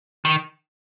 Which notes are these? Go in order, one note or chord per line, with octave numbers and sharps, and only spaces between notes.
D#3